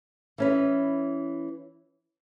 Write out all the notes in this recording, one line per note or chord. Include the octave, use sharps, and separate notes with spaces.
E3 C#4 B4